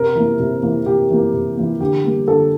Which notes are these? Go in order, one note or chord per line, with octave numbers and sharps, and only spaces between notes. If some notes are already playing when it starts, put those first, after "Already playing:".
Already playing: C3 A#4
E3 A#3
C3
E3 A#3
C3 G4
E3 A#3
C3
E3 A#3
D3 G4
G3 A#3
D3 A4